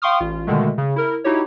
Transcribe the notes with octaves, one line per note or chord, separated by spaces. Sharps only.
F5 G5 C6 C#6 D#6 F6
A1 F4
B2 D3 D#3 G#3 A3
C#3
E4 A#4
D#4 E4 F#4 G4 C#5